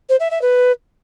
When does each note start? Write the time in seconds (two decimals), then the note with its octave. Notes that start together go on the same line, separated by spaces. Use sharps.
0.09 C5
0.20 E5
0.31 E5
0.42 B4